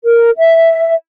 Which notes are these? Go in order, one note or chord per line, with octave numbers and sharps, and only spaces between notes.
A#4
E5